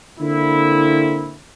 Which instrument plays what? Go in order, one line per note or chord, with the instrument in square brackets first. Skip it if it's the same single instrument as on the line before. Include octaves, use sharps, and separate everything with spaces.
[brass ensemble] D3 A#3 C4 E4